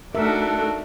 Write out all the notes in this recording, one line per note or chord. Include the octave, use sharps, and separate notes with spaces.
A3 D4 D#4 F#4 A4 A#4 E5